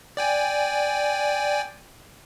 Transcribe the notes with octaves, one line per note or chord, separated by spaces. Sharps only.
D5 G5 G#5